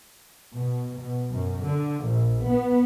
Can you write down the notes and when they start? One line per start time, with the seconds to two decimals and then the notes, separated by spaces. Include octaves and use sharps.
0.54 B2
1.00 B2
1.31 F#2
1.61 D3
2.06 A#1
2.47 B3